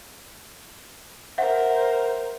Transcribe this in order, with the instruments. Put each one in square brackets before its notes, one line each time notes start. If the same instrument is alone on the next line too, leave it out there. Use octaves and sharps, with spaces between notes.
[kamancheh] A#4 C5 [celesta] E5 F#5